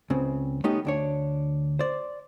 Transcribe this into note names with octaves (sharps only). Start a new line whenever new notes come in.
C#2 C#3 C4
G3 A3 B3 C#4 D#4 G4
D2 D4 C#5
C5 D5